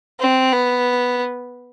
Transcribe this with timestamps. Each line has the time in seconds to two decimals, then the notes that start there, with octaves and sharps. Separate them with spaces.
0.20 C4
0.53 B3